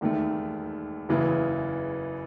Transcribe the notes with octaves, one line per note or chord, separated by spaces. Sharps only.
E1 D#2 D#3 A3
F#1 E2 C#3 E3